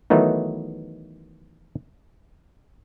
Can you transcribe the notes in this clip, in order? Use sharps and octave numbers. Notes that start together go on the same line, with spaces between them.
D#3 E3 F#3 A3 B3 D#4